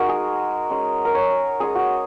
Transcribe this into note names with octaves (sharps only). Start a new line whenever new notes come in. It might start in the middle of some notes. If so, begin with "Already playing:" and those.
Already playing: G#3 D#4 F#4 A#4
G#4
G#3 C#4
A#4
C#5
G#3 C#4 G#4
F#4